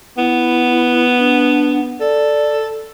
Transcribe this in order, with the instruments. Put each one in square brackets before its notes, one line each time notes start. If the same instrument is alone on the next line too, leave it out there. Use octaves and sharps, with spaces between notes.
[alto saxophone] B3 [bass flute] E4
[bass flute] D4
[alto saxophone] A4 [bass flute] D5